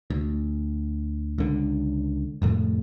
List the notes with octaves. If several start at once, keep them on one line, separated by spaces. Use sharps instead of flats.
D2
C#2 D3
F1 F2 A2 A3